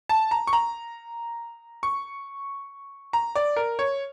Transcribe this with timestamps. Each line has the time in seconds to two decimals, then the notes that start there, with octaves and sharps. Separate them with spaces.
0.09 A5
0.31 A#5
0.47 C#6
0.53 A#5
1.83 C#6
3.13 A#5
3.35 D5
3.56 A#4
3.79 C#5